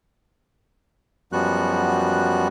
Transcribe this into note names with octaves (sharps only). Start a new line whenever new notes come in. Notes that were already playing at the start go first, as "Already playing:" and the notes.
F#2 F3 G3 B3 F#4 F#6